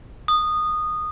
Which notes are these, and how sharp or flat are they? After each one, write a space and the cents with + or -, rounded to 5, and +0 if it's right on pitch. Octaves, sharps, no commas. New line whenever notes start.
D#6 -15